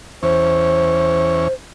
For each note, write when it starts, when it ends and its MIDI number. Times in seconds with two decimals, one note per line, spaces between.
0.23 1.48 40
0.23 1.48 61
0.23 1.53 72